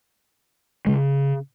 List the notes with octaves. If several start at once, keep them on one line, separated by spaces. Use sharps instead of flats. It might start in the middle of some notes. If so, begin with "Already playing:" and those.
C#3 G#3